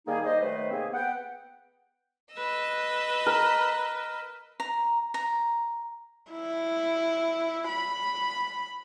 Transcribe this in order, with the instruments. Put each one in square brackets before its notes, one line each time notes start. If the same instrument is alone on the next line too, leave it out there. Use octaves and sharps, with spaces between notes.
[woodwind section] D#3 G3 A#3 D#4 G#4
G3 D#4 C5 D#5
D#3 F#3 A3 B4 C5
C3 D#3 A#3 C4 G#4
B3 F#5 G5
[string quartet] B4 D#5 E6
[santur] A#4
[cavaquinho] A#5
A#5
[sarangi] E4
B5